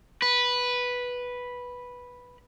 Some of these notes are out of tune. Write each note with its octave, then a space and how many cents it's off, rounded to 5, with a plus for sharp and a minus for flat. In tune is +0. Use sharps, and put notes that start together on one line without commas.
B4 -5